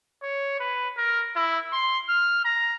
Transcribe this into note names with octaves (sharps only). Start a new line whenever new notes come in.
C#5
B4
A#4
E4
C6
F6
A#5